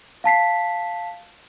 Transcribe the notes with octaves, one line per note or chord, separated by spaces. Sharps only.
F5 A5 B6 C7